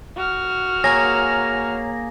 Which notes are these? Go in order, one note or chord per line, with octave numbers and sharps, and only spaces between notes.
F#4 F6
A#3 G#4 C#5 G#5 A#5 A#6